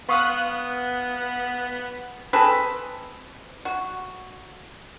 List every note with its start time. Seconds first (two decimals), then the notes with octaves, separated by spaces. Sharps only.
0.09 B3 F5 C#6 D#6 F#6
2.33 C4 G#4 A4 B4
3.65 F#4